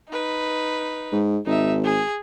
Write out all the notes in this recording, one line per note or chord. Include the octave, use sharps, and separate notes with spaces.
D#4 B4
G#2
G#1 D#4 E5
G#4